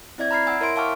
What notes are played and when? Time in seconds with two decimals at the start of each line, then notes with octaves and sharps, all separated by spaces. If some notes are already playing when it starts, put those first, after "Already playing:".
0.18 C4 E4 D5 E5 G#6
0.31 A#5 B5 F6 G#6 C7
0.47 F#5 G#5 E6
0.60 E4 A#4 C#5 E5 C6 D7
0.76 F5 G5 A5 C#6 D6 F6